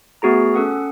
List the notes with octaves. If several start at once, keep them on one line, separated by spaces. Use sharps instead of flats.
A3 B3 F#4 G#4 A#5
C#4 A4 F#5 D#6